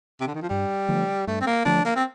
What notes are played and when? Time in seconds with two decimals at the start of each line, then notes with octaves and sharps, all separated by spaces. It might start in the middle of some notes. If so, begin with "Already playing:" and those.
0.21 C3
0.27 D3
0.35 D#3
0.42 F3
0.49 G2 G3
0.88 D3 F3 A3
1.27 G2 A3
1.41 C4
1.47 A#3
1.65 D3 F3 A3 D4
1.85 A#3
1.96 C4